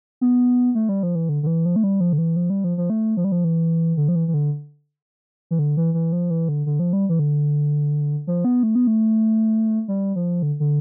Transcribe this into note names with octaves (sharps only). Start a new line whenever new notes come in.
B3
A3
G3
F3
E3
D3
D3
E3
F3
A3
G3
F3
D3
E3
F3
G3
F3
F3
A3
F3
G3
F3
E3
D3
F3
E3
E3
D3
E3
D3
E3
E3
F3
E3
D3
D3
F3
G3
E3
D3
F3
B3
A3
B3
A3
G3
F3
D3
D3